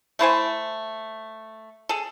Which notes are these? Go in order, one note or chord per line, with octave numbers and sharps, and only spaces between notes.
A3 E4 C5 G#5
G#4 A4